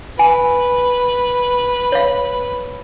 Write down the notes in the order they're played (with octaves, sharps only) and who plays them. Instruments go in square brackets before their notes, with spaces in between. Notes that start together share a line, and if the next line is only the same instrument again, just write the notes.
[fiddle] B4 [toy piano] G#5
[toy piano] C#5 F5